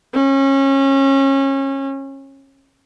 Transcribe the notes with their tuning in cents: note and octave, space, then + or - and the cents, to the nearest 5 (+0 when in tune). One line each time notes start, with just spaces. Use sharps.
C#4 -25